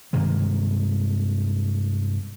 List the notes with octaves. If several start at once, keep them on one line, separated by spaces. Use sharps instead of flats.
G2 C3 D#3 G#3